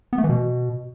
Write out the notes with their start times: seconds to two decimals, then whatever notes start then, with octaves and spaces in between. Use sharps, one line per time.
0.13 B3
0.18 A3
0.24 E3
0.29 B2